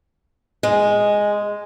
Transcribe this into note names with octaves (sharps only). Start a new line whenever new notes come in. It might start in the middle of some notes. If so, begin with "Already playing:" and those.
G#3